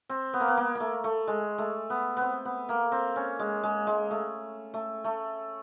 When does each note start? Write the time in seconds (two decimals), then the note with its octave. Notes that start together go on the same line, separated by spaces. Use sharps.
0.09 C4
0.34 B3
0.40 A#3
0.48 B3
0.57 A#3
0.75 A#3
0.80 A3
1.04 A3
1.28 G#3
1.58 A3
1.90 B3
2.17 B3 C4
2.45 B3
2.69 A#3
2.92 C4
3.16 C#4
3.39 G#3
3.63 G#3
3.87 G#3
4.11 A3
4.74 A3
5.04 A3